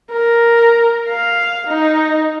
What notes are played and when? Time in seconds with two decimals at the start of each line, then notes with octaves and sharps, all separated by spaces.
0.12 A#4
1.09 F5
1.67 D#4